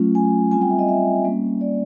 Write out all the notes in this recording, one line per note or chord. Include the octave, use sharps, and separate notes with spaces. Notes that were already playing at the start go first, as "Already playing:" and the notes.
Already playing: F#3 A3 C#4 F4
G#5
G3 C4 F4 G#5
G5
E5
D#5
E5
G3 A#3 C#4
D5